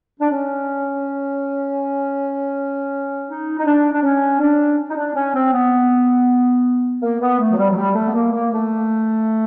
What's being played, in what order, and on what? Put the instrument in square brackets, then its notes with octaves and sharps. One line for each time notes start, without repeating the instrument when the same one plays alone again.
[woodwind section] D4
C#4
D#4
D#4
D4
D4
C#4
D4
D#4
D4
C#4
C4
B3
A#3
B3
A3
F#3
G3
F#3
G3
A3
B3
A#3
A#3
A3